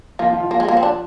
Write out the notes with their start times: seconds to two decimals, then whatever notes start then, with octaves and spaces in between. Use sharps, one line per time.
0.19 F3 A#3 F4
0.30 F3 F4
0.40 F3 F4
0.51 A#3
0.60 G#3
0.68 A#3
0.77 C4
0.83 D4